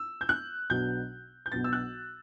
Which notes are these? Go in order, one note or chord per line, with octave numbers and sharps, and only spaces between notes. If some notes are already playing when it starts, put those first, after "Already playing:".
Already playing: E6
G6
F#6
B1 B2 F#3 B3 D4 G6
G6
B1 B2 F#3 B3 D4 A6
E6
F#6